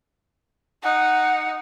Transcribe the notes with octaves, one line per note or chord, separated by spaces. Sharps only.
D#4 F#5